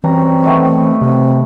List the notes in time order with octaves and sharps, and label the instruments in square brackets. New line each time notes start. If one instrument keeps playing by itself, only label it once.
[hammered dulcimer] F#2 G3 A#5 [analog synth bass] E3 [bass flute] C4
[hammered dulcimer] D#3 A3 B3
[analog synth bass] C3 [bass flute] C4